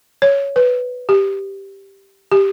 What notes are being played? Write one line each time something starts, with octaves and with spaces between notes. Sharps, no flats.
C#5
B4
G4
G4